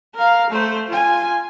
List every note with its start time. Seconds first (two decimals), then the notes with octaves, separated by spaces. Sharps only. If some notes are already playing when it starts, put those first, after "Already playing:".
0.15 A#4 F5
0.50 A3 C5
0.88 F4 G#5